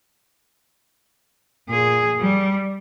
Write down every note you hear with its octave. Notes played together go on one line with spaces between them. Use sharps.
A#2 G#4
G3